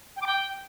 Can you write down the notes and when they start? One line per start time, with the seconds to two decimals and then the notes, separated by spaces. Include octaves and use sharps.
0.16 G5
0.21 D6
0.26 G5